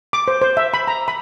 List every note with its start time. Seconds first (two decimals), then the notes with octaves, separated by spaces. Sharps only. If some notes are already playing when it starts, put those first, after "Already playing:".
0.13 D6
0.28 C5
0.42 C5
0.57 E5
0.74 B5
0.88 A#5
1.08 B5